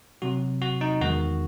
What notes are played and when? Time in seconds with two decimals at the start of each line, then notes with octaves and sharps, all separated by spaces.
0.22 C3 F#3 F#4
0.61 F#4
0.81 D#4
1.01 E2 D#3 G#3 F#4